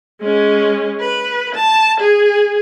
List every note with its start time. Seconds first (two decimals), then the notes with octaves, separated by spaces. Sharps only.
0.21 G#3 C#4
1.01 B4
1.55 A5
2.00 G#4